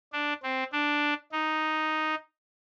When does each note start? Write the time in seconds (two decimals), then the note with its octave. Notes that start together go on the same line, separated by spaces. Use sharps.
0.13 D4
0.43 C4
0.73 D4
1.32 D#4